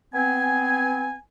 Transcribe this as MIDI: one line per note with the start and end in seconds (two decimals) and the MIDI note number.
0.13 1.15 59
0.13 1.15 60
0.13 1.15 80